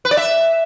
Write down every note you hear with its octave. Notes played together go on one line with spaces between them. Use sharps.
B4
D5
E5